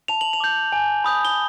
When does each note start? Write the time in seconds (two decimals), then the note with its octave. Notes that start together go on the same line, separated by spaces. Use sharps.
0.08 A5 F7
0.21 F#7
0.33 F7
0.40 D6 G6
0.72 G#5
1.04 B5 D#6 G6
1.25 G7